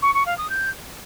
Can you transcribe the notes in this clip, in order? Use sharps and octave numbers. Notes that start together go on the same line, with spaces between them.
C#6
C#6
F5
D#6
G6